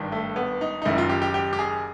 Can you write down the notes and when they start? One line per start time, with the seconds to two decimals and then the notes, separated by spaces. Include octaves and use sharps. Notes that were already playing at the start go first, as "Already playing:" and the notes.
Already playing: G#1 G2 D#3
0.12 A3
0.36 B3
0.61 D#4
0.82 D#4
0.85 F#1 F#2 D#3 E4
0.98 F4
1.09 G4
1.22 G4
1.34 G4
1.53 G4
1.59 G#4